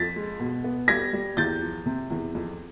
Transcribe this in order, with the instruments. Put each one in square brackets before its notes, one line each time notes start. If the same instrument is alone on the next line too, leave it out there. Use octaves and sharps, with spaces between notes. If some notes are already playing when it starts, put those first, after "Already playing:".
Already playing: [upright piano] F2 A6 B6
G#3
B2
B3
G3 G#6 A#6
G3
E2 G6 A6
F3
C3
E2
F2